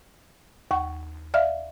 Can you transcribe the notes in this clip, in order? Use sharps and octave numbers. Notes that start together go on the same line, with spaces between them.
D#2 F#5 C#6
D5 E5 F5 F6